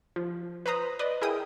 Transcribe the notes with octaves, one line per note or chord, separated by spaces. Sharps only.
F3
B4 C5 A#5 D#6
B4 D5 D#5
E4 G#4 A#4 G5 D#6